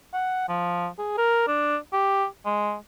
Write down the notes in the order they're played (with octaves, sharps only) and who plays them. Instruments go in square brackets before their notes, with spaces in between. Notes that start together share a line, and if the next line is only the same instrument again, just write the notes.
[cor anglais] F#5
F3
G#4
A#4
D4
G4
G#3